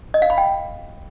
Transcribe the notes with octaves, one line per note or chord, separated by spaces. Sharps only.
D#5
F5
B5
G5